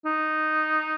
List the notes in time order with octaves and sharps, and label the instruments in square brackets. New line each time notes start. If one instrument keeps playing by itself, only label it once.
[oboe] D#4